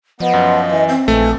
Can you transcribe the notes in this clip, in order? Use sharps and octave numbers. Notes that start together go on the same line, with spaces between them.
F3 B3 D#5
F#2
E3
C4
A#1 E3 A3